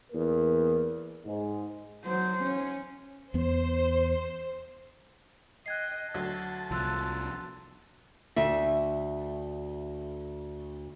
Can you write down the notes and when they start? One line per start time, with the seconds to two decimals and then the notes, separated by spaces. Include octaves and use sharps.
0.12 E2 A#3 A#4
1.25 G#2
2.04 F#3 C5
2.43 C#4
3.34 E2 B3 C5
5.66 D#5 G5 F#6 G#6 C7
6.14 D2 F#3 A5
6.71 C2 F3 C6 E6 F#6
8.36 D2 E5